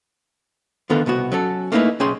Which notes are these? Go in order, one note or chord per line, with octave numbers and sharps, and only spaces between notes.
D3 D#3 B3 F4 A4 A#4
C2 B2 B3 F#4
F#3 C#4 A4
A3 A#3 C#4 D#4 E4 B4
B1 C#4 G#4 G5 C6